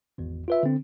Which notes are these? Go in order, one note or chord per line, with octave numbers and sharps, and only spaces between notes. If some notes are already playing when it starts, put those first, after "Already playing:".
G#1 E2
F4 B4 E5
D3 C4